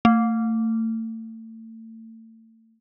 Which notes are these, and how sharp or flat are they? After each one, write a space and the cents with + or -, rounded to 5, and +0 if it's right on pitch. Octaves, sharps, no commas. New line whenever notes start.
A3 +35